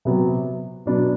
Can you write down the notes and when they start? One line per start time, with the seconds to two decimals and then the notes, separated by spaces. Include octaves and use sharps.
0.05 C3 F#3 B3
0.86 B2 F#3 B3 D4